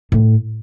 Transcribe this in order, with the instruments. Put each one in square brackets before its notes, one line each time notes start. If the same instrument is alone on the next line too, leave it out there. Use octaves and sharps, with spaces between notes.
[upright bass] A2